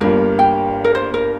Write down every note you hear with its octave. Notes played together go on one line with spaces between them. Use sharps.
G1 G2 G3 A#3 A#4
G5
A#4
C5
A#4